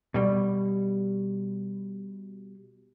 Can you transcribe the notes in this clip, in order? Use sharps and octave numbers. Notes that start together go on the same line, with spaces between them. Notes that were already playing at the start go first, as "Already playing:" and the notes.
B2 G3